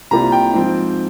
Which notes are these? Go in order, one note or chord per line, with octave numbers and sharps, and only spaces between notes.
C2 C3 G3 A#3 F4 A#5
G5
G#2 F3 C4 F4